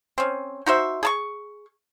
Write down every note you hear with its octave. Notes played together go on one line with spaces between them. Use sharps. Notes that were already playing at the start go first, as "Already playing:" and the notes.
C4 C#4
D#4 F#4 C5 E5
G#4 A5 C#6